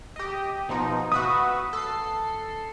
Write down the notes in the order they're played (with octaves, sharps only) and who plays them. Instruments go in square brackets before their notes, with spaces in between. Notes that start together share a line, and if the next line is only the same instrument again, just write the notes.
[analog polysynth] G4 D#5
B2 F3 D#4
[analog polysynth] F#4 B4 E5 [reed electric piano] D#6
[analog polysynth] A4 C7